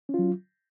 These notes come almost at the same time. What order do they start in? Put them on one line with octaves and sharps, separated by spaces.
C#4 F4 F#3